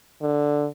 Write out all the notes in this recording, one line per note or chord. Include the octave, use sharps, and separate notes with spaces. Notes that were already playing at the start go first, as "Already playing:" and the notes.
D3